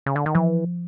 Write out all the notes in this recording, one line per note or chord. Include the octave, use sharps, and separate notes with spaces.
C#3
D3
D#3
E3 F3